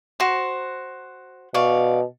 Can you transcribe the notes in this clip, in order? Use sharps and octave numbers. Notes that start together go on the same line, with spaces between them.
F#4 C5
B2 D5 F5 C#6